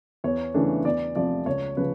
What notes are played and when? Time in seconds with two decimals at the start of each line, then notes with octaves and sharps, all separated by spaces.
0.24 E2 C#5
0.54 C#3 E3 A3 D4
0.85 E2 D5
1.16 C3 F3 A3 D5
1.46 C#2 C#5
1.77 C#3 F3 B4